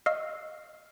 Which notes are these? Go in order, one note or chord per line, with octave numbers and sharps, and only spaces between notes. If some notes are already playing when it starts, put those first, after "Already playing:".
D#5 F5 C#6 E6 F6 C7